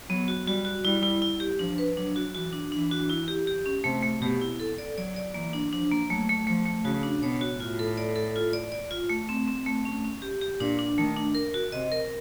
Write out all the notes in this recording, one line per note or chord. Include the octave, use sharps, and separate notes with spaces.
F#3 B3
F#4
G3 F#4
F#4
G3 E4
E4
E4
G4
F3 D4
B4
F#3 D4
F#4
E3 F#4
D4
E3 D4
F#4
E4
G4
G4
C#4
C3 A3
A3
B2 G4
E4
A4
D5
F#3 D5
D5
E3 A#3
D4
F3 D4
A#3
F#3 A3
A3
F3 A3
A3
C#3 F#4
D4
B2 C#5
F#4
A2 F4
A4
D5
A4
F4
D5
D5
F4
A3
C4
C4
A3
C#4
C#4
G4
G4
A#2 D4
D4
D#3 A3
D4
A#4
F#4
C3 D#5
A#4